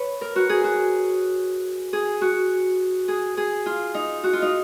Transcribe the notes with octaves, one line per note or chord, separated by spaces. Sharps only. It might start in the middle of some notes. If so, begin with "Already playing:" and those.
Already playing: B4 C#5
A#4
F#4
G#4
F#4
G#4
F#4
G#4
G#4
F4
D#4
F#4
F4
D#4